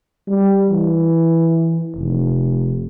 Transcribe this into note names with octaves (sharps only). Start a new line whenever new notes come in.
G3
E3
F1